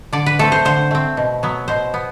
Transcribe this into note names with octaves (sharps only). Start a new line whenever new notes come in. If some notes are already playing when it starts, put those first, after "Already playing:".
D3 D5
B4
A3 C4 A4
C5
D3 C5
A3 C4
B2
F#3 B3
B2 C5
B3